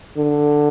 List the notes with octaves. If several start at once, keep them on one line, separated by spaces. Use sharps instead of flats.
D3